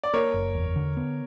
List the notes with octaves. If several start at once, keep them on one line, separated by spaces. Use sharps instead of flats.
D5
A#3 A#4 C#5
F#1
E2
D3
B3